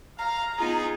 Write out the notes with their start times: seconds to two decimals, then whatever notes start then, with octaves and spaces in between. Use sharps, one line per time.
0.18 F5 A#5
0.58 B3 D#4 F4 G#4